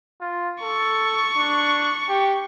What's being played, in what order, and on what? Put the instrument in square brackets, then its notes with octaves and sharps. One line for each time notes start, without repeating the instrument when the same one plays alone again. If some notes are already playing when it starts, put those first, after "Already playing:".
[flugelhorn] F4
[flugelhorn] A4 [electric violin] C#6
[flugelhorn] D4
G4